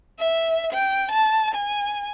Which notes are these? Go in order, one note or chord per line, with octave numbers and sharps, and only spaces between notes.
E5
G5
A5
G#5